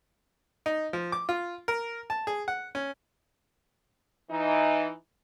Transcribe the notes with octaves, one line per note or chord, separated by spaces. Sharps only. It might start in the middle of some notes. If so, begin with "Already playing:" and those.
D#4
F3
D6
F4
A#4
A5
G#4
F#5
C#4
E3 D#4